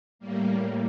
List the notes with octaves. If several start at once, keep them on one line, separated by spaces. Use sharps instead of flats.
A2 G3 A#3